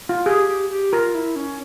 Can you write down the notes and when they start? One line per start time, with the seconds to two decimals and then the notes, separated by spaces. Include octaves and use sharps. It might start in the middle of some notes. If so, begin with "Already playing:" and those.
0.09 F4
0.26 G4 G#4
0.48 G4
0.70 G4
0.92 F4 A#4
1.15 E4
1.36 C#4